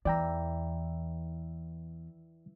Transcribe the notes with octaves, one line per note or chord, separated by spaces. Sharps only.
E2 E3 D5 G5 A#5 E6